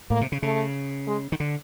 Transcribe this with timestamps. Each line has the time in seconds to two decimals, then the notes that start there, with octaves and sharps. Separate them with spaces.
0.10 A2 A#3
0.21 C3
0.32 C#3
0.42 C#3 A3
1.07 G#3
1.32 D#3
1.40 D3